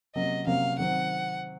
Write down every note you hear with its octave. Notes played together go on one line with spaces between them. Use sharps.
C3 F#3 A#3 C#4 D#5
C3 F#3 A#3 C#4 F5
D#3 F#3 C4 F#5